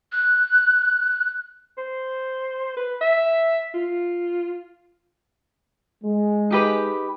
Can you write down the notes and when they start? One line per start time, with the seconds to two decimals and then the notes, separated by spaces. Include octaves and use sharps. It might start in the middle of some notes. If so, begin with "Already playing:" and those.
0.12 F#6
1.78 C5
2.77 B4
3.01 E5
3.74 F4
6.04 G#3
6.50 D#4 G4 B4